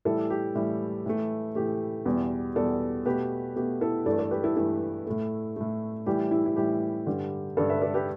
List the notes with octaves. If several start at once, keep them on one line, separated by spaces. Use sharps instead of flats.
A2 E3 G3 E4 A4
G4
A2 E3 G3 E4
A2 E3 A3
A2 E3 A3 G4
E2 B2 G3
E2 B2 G3 A4 D5
B2 A3 G4 B4
B2 A3 G4
E4 A4
G2 E3 A3 A4 D5
A4 D5
G4 B4
E4 A4
G2 E3 A3 E4
A2 A3
A2 A3
A2 E3 G3 G4
E4
E4
A2 E3 G3 G4
G2 D3 G3
G2 D3 G3 A4 D5
B4 E5
A4 D5
G4 B4